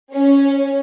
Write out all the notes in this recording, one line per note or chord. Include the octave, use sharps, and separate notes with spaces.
C#4